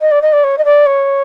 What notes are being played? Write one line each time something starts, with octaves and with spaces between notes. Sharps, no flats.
D#5
D5
D#5
D5
C#5
D#5
D5
C#5